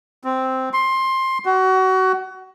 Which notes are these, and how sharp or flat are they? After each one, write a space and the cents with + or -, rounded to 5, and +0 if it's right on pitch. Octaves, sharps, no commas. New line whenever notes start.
C4 -5
C6 +15
F#4 +25